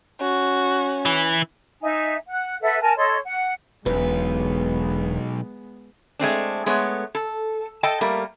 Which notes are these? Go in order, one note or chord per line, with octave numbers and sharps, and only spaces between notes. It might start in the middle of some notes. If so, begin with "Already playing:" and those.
C#4 F#4
E3
D#4 E5 G#5
F#5
A4 B4 E5 F#5
A#4 G#5 A5
A4 C#5 D#5 C6
F#5
E1 B1 G#3 B3 B4
G#3 A3 C4 D4
G#3 A3 B3 C#5
A4
A4 D#5 G5 A5
G3 A3 A#3 A#4